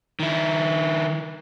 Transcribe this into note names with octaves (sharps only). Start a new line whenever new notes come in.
D#3 E4